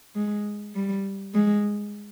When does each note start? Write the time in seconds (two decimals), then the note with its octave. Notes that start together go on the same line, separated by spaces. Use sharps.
0.15 G#3
0.75 G3
1.34 G#3